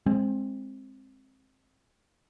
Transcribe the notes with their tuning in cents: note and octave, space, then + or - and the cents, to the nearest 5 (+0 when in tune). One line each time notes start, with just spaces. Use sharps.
G#3 +0 C4 +15